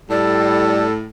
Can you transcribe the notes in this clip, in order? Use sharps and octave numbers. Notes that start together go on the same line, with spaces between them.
A2 G3 A4 D5